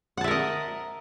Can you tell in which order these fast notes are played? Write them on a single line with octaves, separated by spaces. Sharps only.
F#5 A5 E5 A#4 D#5